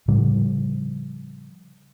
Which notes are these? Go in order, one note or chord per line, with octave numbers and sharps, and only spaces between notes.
A2 C#3 F3 G3